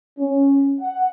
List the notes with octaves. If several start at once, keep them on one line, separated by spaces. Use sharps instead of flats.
C#4
F#5